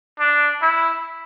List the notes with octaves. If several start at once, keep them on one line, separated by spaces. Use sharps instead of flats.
D4
E4